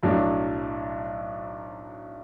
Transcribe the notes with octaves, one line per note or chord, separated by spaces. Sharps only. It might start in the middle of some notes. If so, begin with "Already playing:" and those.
B1 A2 F#3 A3 D4